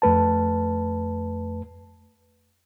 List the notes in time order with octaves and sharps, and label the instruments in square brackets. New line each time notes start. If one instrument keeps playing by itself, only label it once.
[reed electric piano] F2 A3 B4 A5